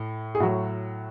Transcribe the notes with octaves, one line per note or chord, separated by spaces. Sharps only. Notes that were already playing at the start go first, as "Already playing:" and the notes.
Already playing: A2
G#4
A2 F#3 F#4